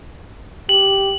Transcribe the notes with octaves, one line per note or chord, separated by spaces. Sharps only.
G4 F#7